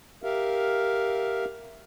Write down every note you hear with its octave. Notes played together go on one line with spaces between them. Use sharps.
G4 A#4 E5 F5